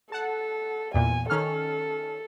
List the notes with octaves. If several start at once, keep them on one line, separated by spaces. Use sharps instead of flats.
A4 F#5 A5
E2 A#2 G#5
D#3 C#4 A4 F6